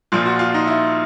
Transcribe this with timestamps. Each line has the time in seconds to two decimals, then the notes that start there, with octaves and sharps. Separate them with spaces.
0.12 A#1 A#2 F3 F4
0.26 F#4
0.39 F4
0.54 D#4
0.67 E4